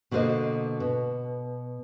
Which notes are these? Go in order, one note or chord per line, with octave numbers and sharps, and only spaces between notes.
B2 D3 A#3 G4 C5 D#5
B2